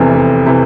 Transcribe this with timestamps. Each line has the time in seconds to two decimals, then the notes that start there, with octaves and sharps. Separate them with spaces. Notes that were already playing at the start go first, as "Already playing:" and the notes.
Already playing: F1 E2 C3 E3
0.14 F1
0.46 C3 E3